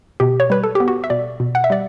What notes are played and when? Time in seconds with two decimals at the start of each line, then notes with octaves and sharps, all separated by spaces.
0.20 B2 G4
0.40 C#5
0.50 G3 B4
0.63 A4
0.75 B3 G4
0.88 F#4
1.04 E5
1.10 B2 D5
1.40 B2
1.55 F#5
1.64 E5
1.70 G3 D5